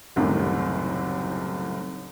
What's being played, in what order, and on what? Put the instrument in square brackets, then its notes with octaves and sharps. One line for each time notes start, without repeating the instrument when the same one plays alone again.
[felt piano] F#1 C2 F#2 A2 C3 D#3